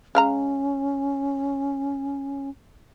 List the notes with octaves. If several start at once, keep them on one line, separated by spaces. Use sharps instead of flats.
G#3 C#4 F5 A#5